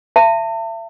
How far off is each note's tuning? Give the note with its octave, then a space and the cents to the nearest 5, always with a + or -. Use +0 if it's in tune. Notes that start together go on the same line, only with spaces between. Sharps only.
E5 +35 A5 +40